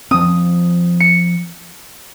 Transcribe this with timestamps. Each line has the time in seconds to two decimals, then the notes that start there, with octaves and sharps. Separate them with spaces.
0.11 F3 C4 D#6
1.00 C#7